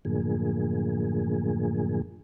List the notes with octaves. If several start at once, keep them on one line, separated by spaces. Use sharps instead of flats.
F#2 A2 D3 F3 A#3 G#4